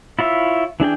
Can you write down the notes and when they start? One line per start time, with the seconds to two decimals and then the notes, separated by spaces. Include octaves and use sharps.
0.19 E4 F4 C#5 E5
0.80 E3 D4 G#4 G5